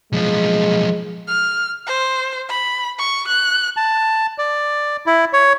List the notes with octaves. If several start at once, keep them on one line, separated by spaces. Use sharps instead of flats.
B1 F3 G#3
F6
C5
B5
C#6
F#6
A5
D5
E4
C#5